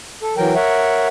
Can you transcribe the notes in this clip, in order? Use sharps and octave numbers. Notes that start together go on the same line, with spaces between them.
A4
E3 F#3 A#4 G5
A#4 C#5 E5 F#5